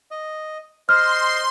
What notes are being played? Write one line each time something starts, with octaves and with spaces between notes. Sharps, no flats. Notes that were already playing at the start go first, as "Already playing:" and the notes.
D#5
C5 D#5 C6 F6